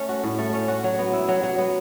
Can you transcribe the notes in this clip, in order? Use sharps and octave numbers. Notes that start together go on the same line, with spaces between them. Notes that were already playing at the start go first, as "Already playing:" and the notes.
Already playing: A3 C#4
F#4
A2
A3
C#4
F#4
F#3
B3
E4
F#3
F#3
B3